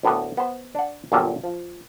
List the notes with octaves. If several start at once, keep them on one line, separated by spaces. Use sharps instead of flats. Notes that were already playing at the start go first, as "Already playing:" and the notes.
D2 A2 A#3 B3
B3 C5
D4 F#5
G1 A#2 F#3 G3 A#3 A5
F3